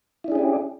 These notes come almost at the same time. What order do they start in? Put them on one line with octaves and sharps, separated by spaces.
E4 D4 G#4 C#4 G4